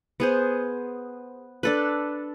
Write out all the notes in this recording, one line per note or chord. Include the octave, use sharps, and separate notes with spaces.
B3 G#4 C5
D4 A4 B4